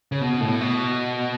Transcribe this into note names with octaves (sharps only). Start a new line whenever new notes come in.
C#3
B2
A2
B2